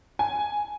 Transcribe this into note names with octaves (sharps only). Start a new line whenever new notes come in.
G#5